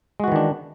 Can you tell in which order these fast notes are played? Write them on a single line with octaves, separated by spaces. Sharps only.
G#3 F#4 E3 D#3 D4